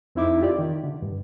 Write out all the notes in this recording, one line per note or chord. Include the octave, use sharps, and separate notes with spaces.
F2 C4 D#4 E4 E5 D6
F4 G4 D5
D#3
D3
G2